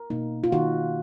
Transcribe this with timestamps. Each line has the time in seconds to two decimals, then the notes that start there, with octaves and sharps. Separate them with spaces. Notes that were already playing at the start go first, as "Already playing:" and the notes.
Already playing: A#4
0.10 B2 A#3 D#4
0.44 F4
0.52 D#3 A#3 D#4 F#4